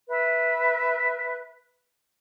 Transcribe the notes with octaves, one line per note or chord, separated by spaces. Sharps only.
B4 E5